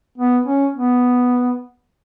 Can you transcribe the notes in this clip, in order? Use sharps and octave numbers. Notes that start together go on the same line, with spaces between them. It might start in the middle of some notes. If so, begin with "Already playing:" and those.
B3
C#4
B3